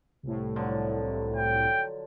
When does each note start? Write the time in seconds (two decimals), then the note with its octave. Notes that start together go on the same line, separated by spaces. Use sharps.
0.23 C2 A2
0.56 D3 F3 F#3
1.36 G5